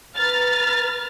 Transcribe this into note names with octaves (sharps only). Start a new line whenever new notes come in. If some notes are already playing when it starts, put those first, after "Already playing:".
B4 A#5 F6 A6